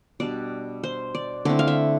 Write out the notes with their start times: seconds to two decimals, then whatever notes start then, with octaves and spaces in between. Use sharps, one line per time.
0.20 B2 G3 D4 D5
0.84 C5
1.15 D5
1.45 D3 A3 C4 E4 D5
1.59 F5
1.67 E5